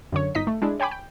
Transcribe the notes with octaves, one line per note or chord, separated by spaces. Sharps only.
F#2 D3 C#5
G1 D#4 D#5 B6
A3
G#3 D4 E4
C#5 G5 G#5 B5 D6
G5